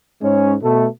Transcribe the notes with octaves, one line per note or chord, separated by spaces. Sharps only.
G#2 G#3 C#4
B2 A3